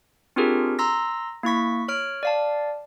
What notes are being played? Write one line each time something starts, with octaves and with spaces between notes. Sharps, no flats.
C4 D4 F4 G4 G#4 A#4
A#5 C6 E6 A#6
A#3 E4 C#6 B6
C#5 F6 D7
D5 F5 A5